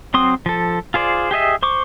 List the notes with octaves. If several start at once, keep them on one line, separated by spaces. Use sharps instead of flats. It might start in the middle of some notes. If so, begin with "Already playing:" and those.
F#3 C4 C6 D#6
F3 A4
F4 G#4 C5 D5
G4 G#4 D#5 E5
C5 C#6 D6